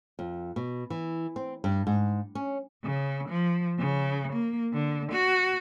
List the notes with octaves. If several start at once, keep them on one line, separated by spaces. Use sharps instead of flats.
F2
B2
E3
C4
G2
G#2
C#4
C#3
F3
C#3
A#3
D3
F#4